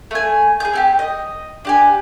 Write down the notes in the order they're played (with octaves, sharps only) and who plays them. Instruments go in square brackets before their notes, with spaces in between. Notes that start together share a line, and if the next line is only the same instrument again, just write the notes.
[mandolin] A3 G#5
G#4 G#5 G6
C4 F#4 G4
D#5
D4 G4 G#5